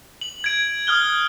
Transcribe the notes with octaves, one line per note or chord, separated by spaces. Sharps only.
F#7
G#6 D7
D#6 F6 F#6 G7